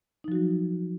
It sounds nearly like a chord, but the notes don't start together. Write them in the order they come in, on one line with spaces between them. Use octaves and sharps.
D#4 F3 F#4 F#3